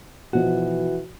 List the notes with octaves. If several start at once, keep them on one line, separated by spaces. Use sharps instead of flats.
B2 E3 F3 F#4